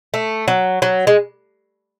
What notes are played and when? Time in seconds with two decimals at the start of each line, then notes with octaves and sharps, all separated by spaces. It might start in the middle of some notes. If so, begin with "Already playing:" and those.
0.14 A3
0.48 F#3
0.82 F#3
1.07 G#3